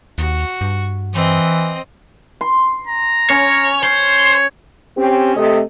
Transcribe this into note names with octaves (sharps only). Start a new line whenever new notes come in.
D#2 F#4
G2
E3 C4 D#5
C6
A#5
C#4 C#5
C5 C#5
C4 C#4 G4
C3 A3 D#5